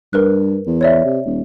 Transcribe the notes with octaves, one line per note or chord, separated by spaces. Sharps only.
G2 A#4 B4 F#6
E2
C#5 D5 E5
C3
D#1